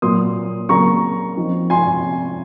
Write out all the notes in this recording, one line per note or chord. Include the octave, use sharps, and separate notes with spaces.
A#2 F#3 A#3 C6 D#6
C#3 F#3 A#3 C#4 A#5 C#6
F3 C4 D#4
G#5 C6